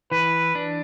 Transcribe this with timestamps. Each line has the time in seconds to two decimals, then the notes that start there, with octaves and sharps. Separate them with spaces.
0.11 E3 B4
0.55 D4